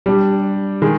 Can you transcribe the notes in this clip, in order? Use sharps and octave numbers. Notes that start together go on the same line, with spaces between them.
G3 D4 G4
D#3 G#3 G#4